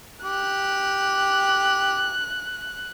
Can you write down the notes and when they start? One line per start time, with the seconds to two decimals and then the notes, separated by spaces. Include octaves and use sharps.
0.24 G4 F#6